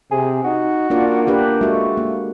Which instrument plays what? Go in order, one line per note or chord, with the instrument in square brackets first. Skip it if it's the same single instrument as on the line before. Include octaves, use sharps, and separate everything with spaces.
[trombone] C3 [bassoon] G#4
[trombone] D#4 [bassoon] F#4
[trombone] A#3 [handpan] D4 F4 D5
[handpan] D4 G4 B4
[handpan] G#3 F#4 [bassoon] A3
[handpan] A#3